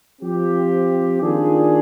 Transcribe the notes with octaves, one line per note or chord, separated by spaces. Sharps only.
F3 C4 G4
D#3 A#3 D4 F4 G#4